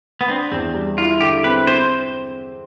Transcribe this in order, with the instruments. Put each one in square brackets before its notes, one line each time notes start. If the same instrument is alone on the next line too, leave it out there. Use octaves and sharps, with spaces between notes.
[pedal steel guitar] B3
[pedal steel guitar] C4 [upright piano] D4
[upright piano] E2 [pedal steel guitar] C4
[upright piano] G3
[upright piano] E4 [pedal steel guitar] F4
[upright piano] D3 [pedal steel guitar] G4
[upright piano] C4 [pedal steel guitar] B4
[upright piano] C4 [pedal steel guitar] C5